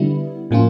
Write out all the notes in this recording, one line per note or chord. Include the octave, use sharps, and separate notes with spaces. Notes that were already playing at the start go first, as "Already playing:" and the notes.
Already playing: D3 G3 B3 E4
A2 F3 A#3 C#4 F4